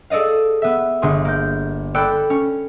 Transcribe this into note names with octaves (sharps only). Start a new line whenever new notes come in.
G#4 A4 D5 D#5 F5
B3 E5
G1 G#4 C6
A#3 G6
A4 D5 G5 B5 D6 F#6
C#4